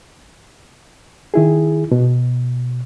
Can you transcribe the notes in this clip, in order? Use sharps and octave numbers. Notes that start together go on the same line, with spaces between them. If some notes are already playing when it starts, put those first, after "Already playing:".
D#3 E4 G#4
B2